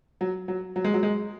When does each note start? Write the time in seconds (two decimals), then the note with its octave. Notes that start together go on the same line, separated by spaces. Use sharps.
0.21 F#3
0.48 F#3
0.76 F#3
0.84 G#3
0.94 F#3
1.03 G#3